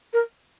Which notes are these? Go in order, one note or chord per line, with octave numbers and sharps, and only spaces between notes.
A#4